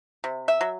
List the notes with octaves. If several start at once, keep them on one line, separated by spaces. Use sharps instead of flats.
C3
E5
F#3